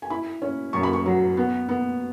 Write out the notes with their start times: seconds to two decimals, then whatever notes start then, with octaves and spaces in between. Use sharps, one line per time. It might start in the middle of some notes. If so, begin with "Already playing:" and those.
0.02 G#5
0.10 E4 B5
0.42 C#4
0.73 F#2 C#6
0.83 B5
0.93 C#6
1.06 F#3
1.37 B3
1.69 B3